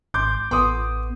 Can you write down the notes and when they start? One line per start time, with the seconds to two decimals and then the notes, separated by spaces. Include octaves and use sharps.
0.14 G#1 C6 D6 G6
0.51 A1 B3 C6 D6 D#6